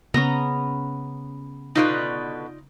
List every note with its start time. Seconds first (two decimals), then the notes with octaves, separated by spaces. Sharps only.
0.14 C#3 B3 C#4 A#5
1.75 B2 D3 D#4 F4 B4 D5